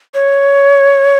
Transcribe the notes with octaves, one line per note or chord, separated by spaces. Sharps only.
C#5